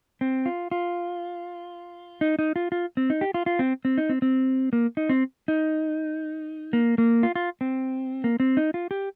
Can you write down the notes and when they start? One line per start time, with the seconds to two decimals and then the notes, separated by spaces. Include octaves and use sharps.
0.21 C4
0.46 F4
0.71 F4
2.21 D#4
2.39 D#4
2.56 F4
2.72 F4
2.97 C4
3.10 D#4
3.21 G4
3.34 F4
3.46 F4
3.59 C4
3.85 C4
3.98 D#4
4.09 C4
4.22 C4
4.73 A#3
4.97 D#4
5.09 C4
5.48 D#4
6.73 A#3
6.98 A#3
7.23 F4
7.35 F4
7.61 C4
8.24 A#3
8.40 C4
8.57 D#4
8.74 F4
8.91 G4